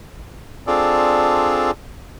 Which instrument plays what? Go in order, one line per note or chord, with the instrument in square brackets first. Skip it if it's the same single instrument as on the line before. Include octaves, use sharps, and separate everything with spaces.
[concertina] C4 D4 F4 G#4 A4 D5